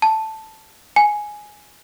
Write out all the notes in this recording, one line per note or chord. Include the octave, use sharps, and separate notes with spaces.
A5
G#5